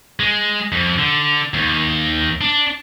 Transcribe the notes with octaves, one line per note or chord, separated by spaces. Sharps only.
G#3
F2
D3
D#2
D4